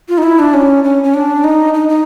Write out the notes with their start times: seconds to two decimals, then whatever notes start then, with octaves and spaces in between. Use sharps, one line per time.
0.09 F4
0.18 D#4
0.23 E4
0.39 D4
0.54 C#4
0.84 C#4
1.04 C#4
1.14 D4
1.44 D#4
1.74 D#4
1.89 D#4